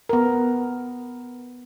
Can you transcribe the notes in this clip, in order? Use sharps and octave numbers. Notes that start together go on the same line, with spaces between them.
B3 A#4